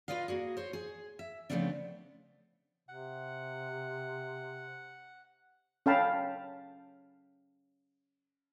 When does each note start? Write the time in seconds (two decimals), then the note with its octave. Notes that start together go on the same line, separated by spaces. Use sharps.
0.08 F4 B4 D5 D#5 F5
0.28 A#3 F#4 G#4
0.57 C5 C#5
0.73 G#4
1.19 E5
1.50 C#3 F3 A3 B3 C4 D4
2.89 C3 F#5
5.86 C#4 A4 F5 G5 A5 B5